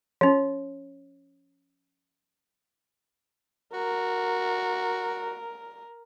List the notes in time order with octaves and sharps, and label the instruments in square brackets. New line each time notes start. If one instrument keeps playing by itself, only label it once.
[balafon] F3 C#4
[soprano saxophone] F#4 [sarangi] A#4